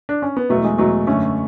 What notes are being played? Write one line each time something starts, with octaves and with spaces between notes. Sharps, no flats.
D4
C#4
B3
E2 B2 F#3 A3
G#3
E2 B2 F#3 A3
F#2 D3 A3 C#4